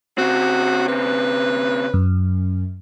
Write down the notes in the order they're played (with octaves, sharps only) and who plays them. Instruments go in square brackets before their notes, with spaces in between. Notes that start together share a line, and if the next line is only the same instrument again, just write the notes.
[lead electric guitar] C#3 C4 [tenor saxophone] F#4
[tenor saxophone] B4
[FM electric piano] F#2